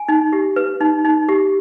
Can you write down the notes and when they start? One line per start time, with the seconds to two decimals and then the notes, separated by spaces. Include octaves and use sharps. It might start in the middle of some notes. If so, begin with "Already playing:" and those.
Already playing: G#5
0.08 D#4
0.32 G4
0.56 B4
0.81 D#4
1.05 D#4
1.29 G4